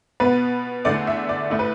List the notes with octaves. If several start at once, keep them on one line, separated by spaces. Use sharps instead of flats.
B2 B3 B4
E2 D3 A3 D5
E5
D5
A2 A3 E4
B4